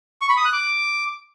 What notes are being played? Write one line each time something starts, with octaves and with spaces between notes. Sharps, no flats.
C#6
B5
D#6
F#6
D6